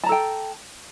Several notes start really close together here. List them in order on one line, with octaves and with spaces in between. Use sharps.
A5 A#5 A4 G5